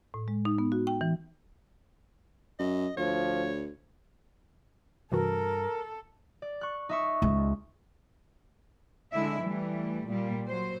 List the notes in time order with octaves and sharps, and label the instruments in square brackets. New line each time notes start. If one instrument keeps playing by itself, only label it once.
[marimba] A2
G#3
D#4
B3
F#4
G5
E3
[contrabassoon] F#2 [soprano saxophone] D#5
[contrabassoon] D2 [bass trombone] F3 [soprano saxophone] C#5
[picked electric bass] G2 [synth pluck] C3 E3 F#4 [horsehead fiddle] A4 [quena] A#4
[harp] D5
C#6 F#6
D#4 E5 C#6
[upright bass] C#2
[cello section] D3 G#3 D4 E4 E5
E3 G3 A3
A#2 G3 A#3
F#3 C5